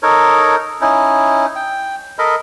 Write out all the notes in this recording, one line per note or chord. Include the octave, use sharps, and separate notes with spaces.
D#4 A4 A#4 C#5
C#4 D#4 E4
G5
A4 A#4 D#5 B5